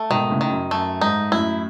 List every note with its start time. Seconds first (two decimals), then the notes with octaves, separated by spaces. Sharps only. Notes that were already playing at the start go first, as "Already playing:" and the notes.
Already playing: A3
0.10 G#2 B2 D#3
0.30 A2 C#3
0.41 D#3
0.50 F#2
0.71 F#2 A3
1.01 G#2 D#4
1.31 F#2 A2 E4